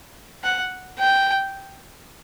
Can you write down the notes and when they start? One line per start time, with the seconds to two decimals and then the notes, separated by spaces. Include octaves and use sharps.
0.44 F#5
0.99 G5